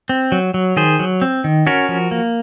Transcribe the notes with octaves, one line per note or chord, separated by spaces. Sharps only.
C4
F#3
F#3
D#3 G#4 C5
F#3
C4
D#3
C#4 F#4 A#4
F3
A#3